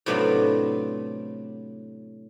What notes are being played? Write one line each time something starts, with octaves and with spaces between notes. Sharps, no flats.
A2 C3 F#3 B3 D4 F4